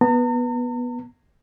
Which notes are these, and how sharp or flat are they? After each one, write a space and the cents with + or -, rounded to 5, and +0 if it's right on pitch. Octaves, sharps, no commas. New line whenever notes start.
B3 -10 A#5 -45